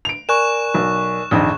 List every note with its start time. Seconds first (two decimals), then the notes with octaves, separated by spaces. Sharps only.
0.05 D7 F7
0.29 A#4 D5 G#5 C#6 F#6 E7
0.74 B1
1.31 A#1 F2 D#3